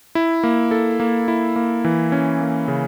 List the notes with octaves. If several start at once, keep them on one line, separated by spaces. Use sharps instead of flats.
E4
A#3
A4
A#3
E4
A#3
E3
C#4
A#3
C#3